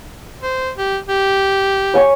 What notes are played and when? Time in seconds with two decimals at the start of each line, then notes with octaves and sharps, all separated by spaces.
0.42 C5
0.77 G4
1.09 G4
1.94 C#5 G#5 C#6